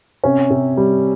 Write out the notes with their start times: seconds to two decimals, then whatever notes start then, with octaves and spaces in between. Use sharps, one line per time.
0.24 C3 C#4
0.50 C3
0.77 G3